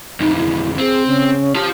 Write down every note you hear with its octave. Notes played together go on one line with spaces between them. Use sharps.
B1 F2 D#4
E4
C4 G#4
C#3
F4 G4 A5